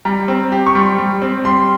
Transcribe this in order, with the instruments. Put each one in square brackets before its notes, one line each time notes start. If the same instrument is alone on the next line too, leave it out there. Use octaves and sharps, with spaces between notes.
[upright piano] G3 [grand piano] A#5
[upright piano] C4
G4
[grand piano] C#6
[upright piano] G3 [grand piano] C6
[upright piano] G3
C4
[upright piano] G3 [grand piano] C6